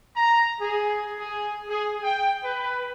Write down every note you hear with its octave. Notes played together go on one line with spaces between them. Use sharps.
A#5
G#4
G#4
G#4
G5
B4